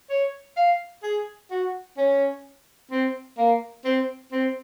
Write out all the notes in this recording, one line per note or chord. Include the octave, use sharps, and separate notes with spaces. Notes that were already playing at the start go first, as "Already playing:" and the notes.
C#5
F5
G#4
F#4
C#4
C4
A#3
C4
C4